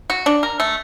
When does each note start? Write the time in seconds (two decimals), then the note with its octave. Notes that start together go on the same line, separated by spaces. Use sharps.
0.10 F#4
0.26 D4
0.43 A#4
0.60 A3